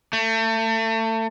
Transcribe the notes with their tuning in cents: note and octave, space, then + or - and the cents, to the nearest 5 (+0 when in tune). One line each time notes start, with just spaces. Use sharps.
A3 +30